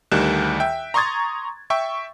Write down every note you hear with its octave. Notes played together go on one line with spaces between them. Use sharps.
D2 D#3 G3 D4 F#6 E7
E5 G5
A#5 C6 C#6 D#6 G#6 A6
E5 G5 C#6 E6